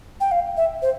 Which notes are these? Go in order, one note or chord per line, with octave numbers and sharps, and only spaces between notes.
G5
F5
E5
C5